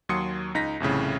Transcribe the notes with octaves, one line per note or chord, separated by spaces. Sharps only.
D#2 F#3 C6 D#6 C#7
C#2 D#4 A#6 B6
C2 F2 A2 C#3